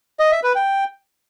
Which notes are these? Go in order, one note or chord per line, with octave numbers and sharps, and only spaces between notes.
D#5
E5
B4
G5